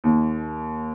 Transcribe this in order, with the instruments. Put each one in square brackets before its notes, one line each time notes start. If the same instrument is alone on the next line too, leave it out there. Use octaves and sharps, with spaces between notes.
[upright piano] D#2